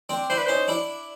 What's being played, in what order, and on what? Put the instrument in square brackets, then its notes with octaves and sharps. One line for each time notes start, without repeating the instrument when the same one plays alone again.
[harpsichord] C4 D4
[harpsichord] D4 E4 [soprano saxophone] C5
[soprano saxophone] B4
[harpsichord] C#4 D#4 [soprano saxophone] C5
[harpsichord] D4 E4